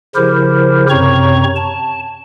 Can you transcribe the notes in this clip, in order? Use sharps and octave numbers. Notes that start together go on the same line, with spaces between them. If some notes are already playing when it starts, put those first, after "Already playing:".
C#3 F3 E4 G4 A#4 C5
F#2 C3 C4 C#5 A#5 C#6
A5